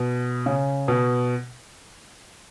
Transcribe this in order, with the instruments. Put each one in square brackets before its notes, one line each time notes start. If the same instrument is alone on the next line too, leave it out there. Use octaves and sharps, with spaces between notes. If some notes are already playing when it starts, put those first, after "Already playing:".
Already playing: [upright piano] B2
C#3
B2